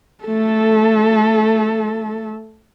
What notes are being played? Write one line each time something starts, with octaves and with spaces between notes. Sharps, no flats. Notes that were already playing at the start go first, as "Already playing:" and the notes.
A3 A4